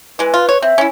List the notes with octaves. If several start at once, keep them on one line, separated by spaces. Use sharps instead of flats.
E3 G#3 B4
F4
C#5
C4 E5
C#4 E4